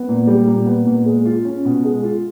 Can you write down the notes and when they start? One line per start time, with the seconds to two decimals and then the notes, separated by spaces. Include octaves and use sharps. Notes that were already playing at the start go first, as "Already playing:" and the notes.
Already playing: B3
0.09 A#2
0.27 G3
0.47 A#2
0.66 B3
0.87 A#2
1.05 G#3
1.25 F4
1.45 C#4
1.65 B2
1.84 G#3
2.03 F4